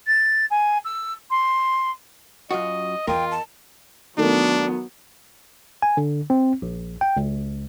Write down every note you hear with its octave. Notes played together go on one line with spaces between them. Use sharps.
A6
G#5
E6
C6
F#2 F4 F#4 D#5
E2 F4 A#4 D#5 G5
A5
D#3 F#3 A3 B3 D4
G#5
D3
C4
A#1
G5
C#2